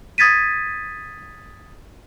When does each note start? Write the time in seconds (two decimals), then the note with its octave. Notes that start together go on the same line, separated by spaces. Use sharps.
0.18 D#6 G#6 A6 B6 D#7